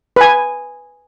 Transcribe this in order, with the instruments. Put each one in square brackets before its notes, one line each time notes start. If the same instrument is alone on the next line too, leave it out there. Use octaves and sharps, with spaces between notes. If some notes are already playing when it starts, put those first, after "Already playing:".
[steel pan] B4 G#5